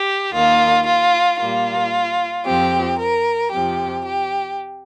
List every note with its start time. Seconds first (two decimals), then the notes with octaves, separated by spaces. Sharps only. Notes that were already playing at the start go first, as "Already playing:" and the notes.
Already playing: G4
0.32 D#2 D#3 A#3 F4
0.85 F4
1.39 A#2 G3 A#3 F4
2.46 F2 F3 C4 G4
2.99 A#4
3.52 F2 C3 F3 G4
4.05 G4